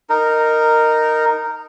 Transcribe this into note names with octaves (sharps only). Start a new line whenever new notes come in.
D#4 A#4